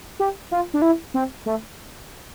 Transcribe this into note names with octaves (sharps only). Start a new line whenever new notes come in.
G4
F4
D4
E4
C4
A3